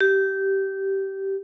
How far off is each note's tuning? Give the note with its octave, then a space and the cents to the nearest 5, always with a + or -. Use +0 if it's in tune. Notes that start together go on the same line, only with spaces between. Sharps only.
G4 -15